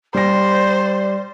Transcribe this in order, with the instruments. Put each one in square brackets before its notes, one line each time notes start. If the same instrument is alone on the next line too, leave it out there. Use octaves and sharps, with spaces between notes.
[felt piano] G3 A#6 [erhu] C5 [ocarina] D5